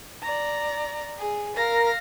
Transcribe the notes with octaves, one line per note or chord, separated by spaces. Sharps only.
D5 A#5
G#4
A#4 F5 A#6